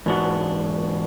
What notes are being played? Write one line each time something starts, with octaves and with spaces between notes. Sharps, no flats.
E2 G#2 D4 F#4 F#5